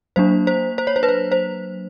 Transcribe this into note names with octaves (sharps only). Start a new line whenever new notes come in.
F#3 A#3 D4 C5
C5
C5
C#5
C5
B4
C5
C5